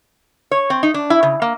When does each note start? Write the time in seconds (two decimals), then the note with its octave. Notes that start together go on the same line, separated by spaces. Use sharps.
0.51 C#5
0.70 C4
0.83 D#4
0.94 D4
1.10 E4
1.23 C#3
1.42 A#3